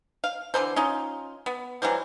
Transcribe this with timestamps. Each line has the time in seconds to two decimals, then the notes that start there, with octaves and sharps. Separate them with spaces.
0.24 F5
0.54 D3 E3 A4 C5
0.76 C#4 D#4 F4
1.46 B3
1.82 E3 F#3 G3 C5